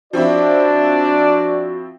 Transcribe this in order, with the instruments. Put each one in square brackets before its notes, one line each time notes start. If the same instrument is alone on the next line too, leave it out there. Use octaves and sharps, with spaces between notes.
[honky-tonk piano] F3 C4 E4 [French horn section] D4 D5 [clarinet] F#4